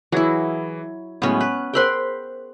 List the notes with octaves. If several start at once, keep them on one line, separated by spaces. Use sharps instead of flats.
E3 F#3 E4 G#4 G#6
A2 F#3 G#3 B3 C#4
B4 F#6
G#4 A#4 C5 G5 B5 C6